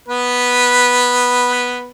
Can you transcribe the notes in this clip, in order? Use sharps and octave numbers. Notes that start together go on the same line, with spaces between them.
B3 B4